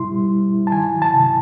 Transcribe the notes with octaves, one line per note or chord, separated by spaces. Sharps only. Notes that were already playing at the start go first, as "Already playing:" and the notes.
Already playing: B2 G3 E4 C6
G3
E4
E4
A5
D#3 G#5
F#3
A5
C3